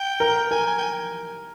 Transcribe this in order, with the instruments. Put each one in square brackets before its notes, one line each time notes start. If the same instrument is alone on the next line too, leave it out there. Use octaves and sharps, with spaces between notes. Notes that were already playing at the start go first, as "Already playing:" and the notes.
Already playing: [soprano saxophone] G5
[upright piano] A#4
[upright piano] A#4 [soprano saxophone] G#5
[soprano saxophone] G#5
G5
G#5